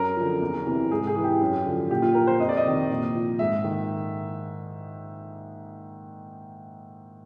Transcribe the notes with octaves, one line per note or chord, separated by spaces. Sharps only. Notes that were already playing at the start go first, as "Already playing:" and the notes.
Already playing: F#2 A#4
D3 F3
E2
C3 E3
G#2 G#4
G#4
E3
G4
F#2
D3 F3
A#2 G4
F4
F3 A#4
C5
F2 D#5
D5
D#5
C3 D#3
A#2
F3
G#2 E5
D#3